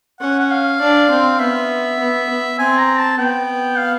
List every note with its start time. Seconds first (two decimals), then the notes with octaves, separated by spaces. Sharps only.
0.20 C#4 F#5
0.39 F#5
0.51 F5
0.80 D4
1.10 C4
1.39 B3 E5
1.99 B3
2.29 B3
2.59 C4 G#5
2.78 A#5
2.99 A5
3.18 B3 G5
3.78 F5